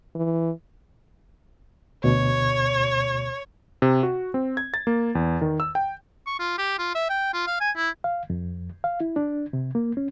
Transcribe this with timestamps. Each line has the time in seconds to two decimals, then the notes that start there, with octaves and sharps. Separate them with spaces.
0.15 E3
2.04 D2 B2 C#5
3.82 C3
4.03 F#4
4.34 C4
4.57 G#6
4.74 A6
4.87 A#3
5.15 E2
5.41 D#3
5.60 E6
5.75 G5
6.27 C#6
6.39 F4
6.58 G4
6.79 F4
6.95 E5
7.10 G5
7.33 F4
7.47 F5
7.60 G#5
7.76 E4
8.04 F5
8.30 F2
8.84 F5
9.00 E4
9.16 D4
9.53 C3
9.75 A#3
9.97 C#4